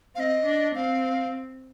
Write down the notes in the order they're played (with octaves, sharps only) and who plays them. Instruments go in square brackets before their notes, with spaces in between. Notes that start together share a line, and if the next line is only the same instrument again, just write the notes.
[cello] C4 [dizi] D#5 F5
[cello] D4
[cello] C4 [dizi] F5